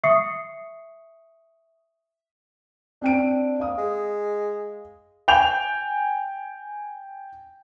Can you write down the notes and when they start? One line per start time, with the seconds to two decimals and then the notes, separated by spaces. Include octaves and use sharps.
0.04 E5 C#6 D#6 C7 C#7
3.02 C4 D4 G5 D7
3.60 F5 D#6
3.78 G#3
5.28 G5 G#5 G6 F7